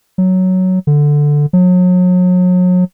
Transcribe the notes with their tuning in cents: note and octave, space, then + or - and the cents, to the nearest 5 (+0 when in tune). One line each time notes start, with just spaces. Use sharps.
F#3 +5
D3 +0
F#3 -35